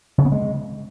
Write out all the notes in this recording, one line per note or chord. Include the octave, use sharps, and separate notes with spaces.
C#3
B3
G#3